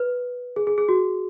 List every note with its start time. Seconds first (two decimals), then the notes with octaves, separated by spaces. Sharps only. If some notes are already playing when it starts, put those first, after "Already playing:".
Already playing: B4
0.56 G#4
0.67 G#4
0.78 G#4
0.89 F#4